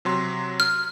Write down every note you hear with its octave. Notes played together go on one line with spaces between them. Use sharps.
C3 F#3 C6
F6